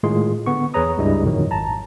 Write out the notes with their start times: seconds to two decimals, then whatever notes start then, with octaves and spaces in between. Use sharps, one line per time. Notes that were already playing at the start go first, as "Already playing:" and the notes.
0.03 A2 D#3 G#3 F4 G#4 C6
0.46 D3 B3 C#6
0.74 E2 G#4 B4 C#5 A#5 D#6
0.98 C#2 G2 G3 E4 G#4 D#5
1.24 F2 A#2 D3 D#3 F#3
1.51 G#1 A5 A#5